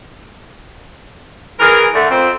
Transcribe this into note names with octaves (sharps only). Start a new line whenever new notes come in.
E3 G#4 A#4
D3 A3
F2 C4